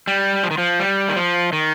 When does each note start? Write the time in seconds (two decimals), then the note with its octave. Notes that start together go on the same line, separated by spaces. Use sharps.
0.08 G3
0.44 F3
0.51 D#3
0.58 F3
0.80 G3
1.09 D#3
1.16 F3
1.53 D#3